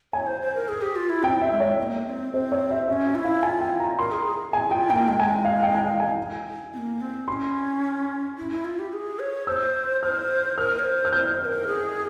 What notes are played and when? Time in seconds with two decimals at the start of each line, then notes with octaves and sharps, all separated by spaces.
0.13 C#5 G#5
0.27 C5
0.41 C5
0.55 A#4
0.69 G#4
0.81 G4
0.96 F4
1.10 E4
1.23 C4 G5
1.41 E5
1.51 G#3
1.60 C#5
1.78 C4
1.82 A#3
2.06 C4
2.33 C4 C5
2.52 C#5
2.70 E5
2.88 C#4 E5
3.07 E5
3.15 F4
3.19 E4
3.25 F5
3.42 F4 G#5
3.61 G5
3.80 A#5
3.99 A#4 C6
4.12 G#4
4.26 G#4
4.53 G#4 G#5
4.71 F4 G5
4.90 A#3 G5
5.08 G#3 G5
5.19 G#5
5.26 G5
5.45 F5
5.63 G5
5.74 G#5
5.81 G5
6.00 G#5
6.73 C4
6.78 A#3
7.01 C4
7.27 C#4 C6
8.38 E4
8.52 E4
8.65 F4
8.79 G4
8.93 G#4
9.19 C#5
9.47 C5 E6
10.03 C5 F6
10.57 A#4 F6
10.79 C#5
10.85 C5
11.05 F6
11.12 C5 G6
11.40 C5
11.45 A#4
11.67 G#4